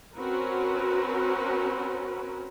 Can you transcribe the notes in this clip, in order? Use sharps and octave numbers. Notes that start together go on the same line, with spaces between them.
C4 C#4 F#4 A#4 B4